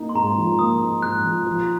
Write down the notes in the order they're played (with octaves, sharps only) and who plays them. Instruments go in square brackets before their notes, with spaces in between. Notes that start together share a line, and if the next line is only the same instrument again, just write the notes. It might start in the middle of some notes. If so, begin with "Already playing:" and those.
Already playing: [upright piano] A#3 D#4
[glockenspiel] C6
[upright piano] G#2 [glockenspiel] A#5
[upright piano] F3
[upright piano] A#3 [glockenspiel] D#6
[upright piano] D#4
[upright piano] G#2 [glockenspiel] F#6
[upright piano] F3
F3